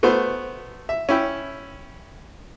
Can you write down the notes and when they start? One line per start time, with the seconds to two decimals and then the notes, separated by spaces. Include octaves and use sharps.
0.03 A3 B3 F#4 C5
0.89 E5
1.09 C#4 E4 G5